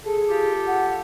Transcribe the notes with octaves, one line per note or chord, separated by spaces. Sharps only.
G#4 A4
F4 G4
F#5